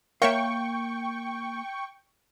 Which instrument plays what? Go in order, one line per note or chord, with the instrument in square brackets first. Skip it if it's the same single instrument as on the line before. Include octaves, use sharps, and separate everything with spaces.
[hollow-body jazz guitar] A#3 F5 [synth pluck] A#4 C#5 E5 [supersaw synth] G5 C#6